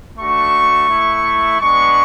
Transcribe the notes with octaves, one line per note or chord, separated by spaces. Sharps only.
A3 D4 F#4 C#6
A3 E4
G#3 B3 D4 C#6